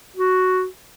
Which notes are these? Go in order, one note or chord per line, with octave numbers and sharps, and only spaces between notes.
F#4